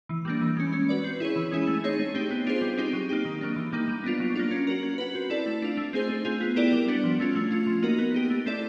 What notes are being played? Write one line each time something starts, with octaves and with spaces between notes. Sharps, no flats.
E3
G3 A#3 D4
E3
G#3 C#4
C#4
F#4 B4 D5
C4
E4 G#4 C#5
E3
G#3 C#4 E4 G#4
A3
C4 D#4 G#4 C#5
A3
C4 D#4 G4
B3
D4 F4 G#4 C5
G3
C4 D#4 G4
F#3
A#3 D#4 G4
D#3
F#3 A#3 D4
E3
G3 A#3 D#4
G3
B3 D4 F4
F#3
A#3 D4 F4
C#4
F#4 A#4
C#4
F#4 B4
C4
E4 A4 D5
A3
D4 F4
A3
C4 D#4 G#4 C5
A3
C4 F4 G#4
B3
E4 G4 A#4 D5
G3
B3 D4 F#4
F3
A3 C#4 F4
A3
C#4 F4
F3
A#3 D#4 F#4 A#4
B3
D#4 G4
A3
C4 E4 A4 D5